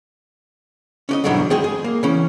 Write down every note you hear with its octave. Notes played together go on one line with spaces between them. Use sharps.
C#4 D5 D#5
E2 G2 B2 D3 F#3 B3
D#3 G#3 G#4 G5
G#4
A#3
C#3 E3 C#4